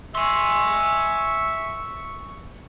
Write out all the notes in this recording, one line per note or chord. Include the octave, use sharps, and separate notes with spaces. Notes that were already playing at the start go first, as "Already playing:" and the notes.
E5 G#5 C6 C#6